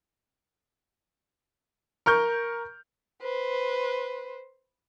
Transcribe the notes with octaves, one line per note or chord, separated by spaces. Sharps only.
A#4 C#6 F6 G6
B4 C5